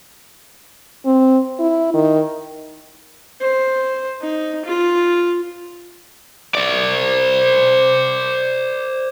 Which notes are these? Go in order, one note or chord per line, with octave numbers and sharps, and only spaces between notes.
C4
E4
D#3
C5
D#4
F4
C5 D5